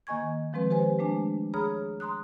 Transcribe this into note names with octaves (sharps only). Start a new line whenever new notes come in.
D#3 A#3 D#5 G#5 C#6 G#6
D#3 F3 G#3 C4 B4
G4 B4 C5 G#5
G#3 A3 D4 G#5
G#4 C#5 A#5 B5 D#6 F6
A#5 C6 D#6 F#6